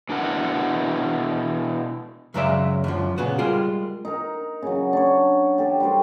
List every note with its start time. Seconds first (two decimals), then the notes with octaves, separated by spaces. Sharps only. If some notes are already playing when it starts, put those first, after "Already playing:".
0.09 B2 D4 E4 A#4 F#5
2.34 F#2 C#3 F#3 G#3 D5 E5
2.84 F#2 D3 F3
3.18 A#2 C#3 B3 F#4
3.38 G3 G#3 F4 G#4 A#4
4.05 D#4 A#4
4.62 C#3 F#3
4.93 D4 C#5
5.58 G4 A4
5.80 G3 F#4 A#4 C5